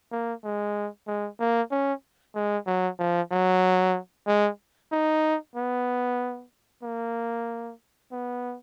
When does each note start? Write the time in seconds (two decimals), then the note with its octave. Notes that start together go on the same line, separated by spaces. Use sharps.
0.11 A#3
0.44 G#3
1.07 G#3
1.40 A#3
1.71 C#4
2.35 G#3
2.67 F#3
2.99 F3
3.31 F#3
4.27 G#3
4.92 D#4
5.56 B3
6.83 A#3
8.12 B3